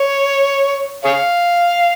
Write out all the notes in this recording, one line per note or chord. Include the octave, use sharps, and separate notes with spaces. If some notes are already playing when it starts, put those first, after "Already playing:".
Already playing: C#5
G#4 C#5 F5